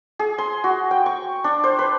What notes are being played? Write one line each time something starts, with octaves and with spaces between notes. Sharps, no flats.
G#4
C6
F#4
G5
C#6
D4
C5
B4